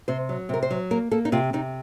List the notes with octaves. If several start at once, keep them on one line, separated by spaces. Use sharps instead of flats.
C3 C5
F#3
C3 A#4
C5
F#3
A#3 A#4
A#3 A4
D#4
C3 F4
C3 D#4